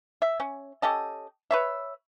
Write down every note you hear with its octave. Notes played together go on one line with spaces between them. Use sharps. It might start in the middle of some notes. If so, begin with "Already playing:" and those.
E5
C#4
C#4 G4 A4 D#5
B4 C#5 E5